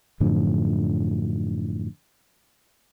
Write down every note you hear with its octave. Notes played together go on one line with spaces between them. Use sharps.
F#2 A2 D3 F3